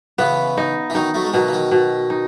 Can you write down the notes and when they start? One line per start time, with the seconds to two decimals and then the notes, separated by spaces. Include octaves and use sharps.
0.18 C#3 E3 B3
0.58 D#4
0.90 E3
0.95 D#3 F#3 D#4
1.14 F#3 A3
1.25 G#3
1.33 B2 D#3 F#3
1.48 E3
1.52 D#3 F#3
1.72 B2
2.10 D#4